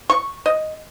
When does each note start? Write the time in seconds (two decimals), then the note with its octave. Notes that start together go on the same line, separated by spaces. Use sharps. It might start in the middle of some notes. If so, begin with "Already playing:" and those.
0.10 C#6
0.46 D#5